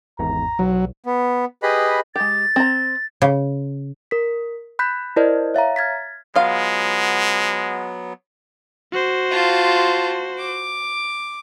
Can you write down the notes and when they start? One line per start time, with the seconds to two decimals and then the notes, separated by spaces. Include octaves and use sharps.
0.19 G#1 E2 G#2 A#5
0.59 B1 F#3
1.06 B3
1.63 G4 G#4 B4 D#5 B5
2.16 G#3 G4 A6
2.56 C4 A#5
3.22 C#3
4.11 A#4 B6
4.79 B5 F#6 G6 A6 B6
5.16 E4 A#4 C5 D5 D#5
5.54 C#5 E5 F5 A#5
5.76 F6 G#6 A6 B6
6.35 F#3 G#3 B3 F4 F5
8.92 F#4 C5
9.31 F4 A5
10.38 D6